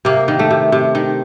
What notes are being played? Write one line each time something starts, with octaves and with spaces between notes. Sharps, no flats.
C3 A#3
D#3
A3
C3
C3
D#3